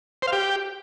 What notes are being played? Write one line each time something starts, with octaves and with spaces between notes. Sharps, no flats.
C5
F5
G4